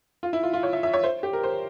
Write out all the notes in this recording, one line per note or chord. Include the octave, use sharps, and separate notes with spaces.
F4
E4
F4
F4
C#5
E5
E5
C#5
C5
G4
A#4
C5